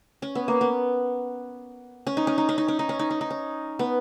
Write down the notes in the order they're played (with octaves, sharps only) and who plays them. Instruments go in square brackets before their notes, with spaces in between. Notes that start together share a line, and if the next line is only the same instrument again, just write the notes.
[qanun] C#4
B3
A#3
B3
C#4
D#4
C#4
D#4
C#4
D#4
C#4
D#4
C#4
D#4
C#4
D#4
C#4
B3